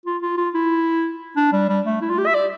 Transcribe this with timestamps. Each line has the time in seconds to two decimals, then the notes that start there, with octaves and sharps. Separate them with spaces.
0.06 F4
0.22 F4
0.37 F4
0.54 E4
1.36 D4
1.53 G3
1.69 G3
1.86 A3
2.01 E4
2.10 F4
2.18 G4
2.26 E5
2.34 D5